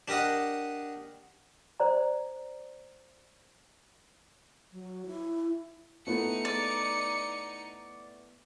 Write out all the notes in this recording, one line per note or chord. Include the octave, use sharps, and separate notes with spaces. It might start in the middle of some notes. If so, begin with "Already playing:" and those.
D4 G4 A#4 D#5 F#5
C5 D5 A#5
F#3
E4
A3 B3 D#4 E4 C#7
D5